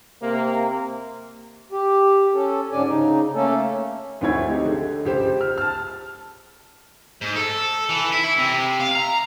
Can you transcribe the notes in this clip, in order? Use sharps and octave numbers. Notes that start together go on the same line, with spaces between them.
C3 A#3
G4
C#4 A4
G#2 D3 C#4 D4 D5 G#5
C#3 D#4
A3 A#3 C#4 A4
D2 C4 E4 C#5 G#6
G#3 D#4 G4
D3
C#2 G4 C5
F6
A5 F6
G#2
A4
E3
E4
E4
C3
F5
A#5